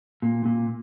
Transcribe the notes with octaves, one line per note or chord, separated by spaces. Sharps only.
A#2
A#2